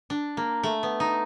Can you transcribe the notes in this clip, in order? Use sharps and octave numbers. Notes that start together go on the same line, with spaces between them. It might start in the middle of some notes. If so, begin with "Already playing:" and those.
D4
A#3
A3
B3
D#4